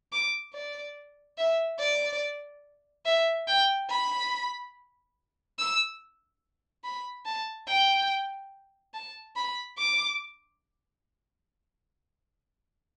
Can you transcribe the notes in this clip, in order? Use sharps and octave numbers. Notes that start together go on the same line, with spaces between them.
D6
D5
E5
D5
E5
G5
B5
E6
B5
A5
G5
A5
B5
D6